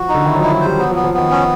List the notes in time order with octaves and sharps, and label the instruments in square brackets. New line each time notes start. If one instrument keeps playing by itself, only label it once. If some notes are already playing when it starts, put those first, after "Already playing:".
Already playing: [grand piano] F3 [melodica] F#4
[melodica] D#4
[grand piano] D3
[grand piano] D#3 [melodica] E4
[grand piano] F#3
[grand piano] F3 [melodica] E4
[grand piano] F#3
[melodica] C5
[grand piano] G3
[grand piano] F#3 [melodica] B3
[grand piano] F3
[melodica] B3
[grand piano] F3
[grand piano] D#3 [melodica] B3
[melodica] C#4